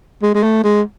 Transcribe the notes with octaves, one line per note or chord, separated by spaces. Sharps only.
G#3
G#3
A3
G#3